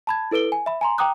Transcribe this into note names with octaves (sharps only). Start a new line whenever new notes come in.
A5 B5 G#6
E4 A4 B4 D7 G7
G#5
E5 B5
G#5 A#5 C6
G5 A#5 D6 D#6 F#6